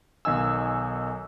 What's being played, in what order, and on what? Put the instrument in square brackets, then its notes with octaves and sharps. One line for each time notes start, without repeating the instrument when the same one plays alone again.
[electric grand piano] B1 D#3 D#5 G#5 E6